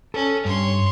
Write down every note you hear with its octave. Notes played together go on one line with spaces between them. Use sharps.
C#4 A4
G2 C#5 C6